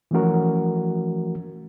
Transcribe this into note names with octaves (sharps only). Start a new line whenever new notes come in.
E3 F3 A3 C#4 F#4 A#4